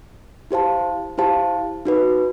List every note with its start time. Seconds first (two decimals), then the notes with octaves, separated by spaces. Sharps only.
0.51 E4 G4 C5 F5 A5
1.18 E4 G4 C5 F5 A5
1.85 D#4 F#4 B4